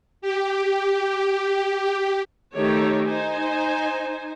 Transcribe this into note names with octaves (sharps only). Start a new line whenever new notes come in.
G4
G4
D#3 A3 D#4 G4 A4 C#5
D#4 C5 G#5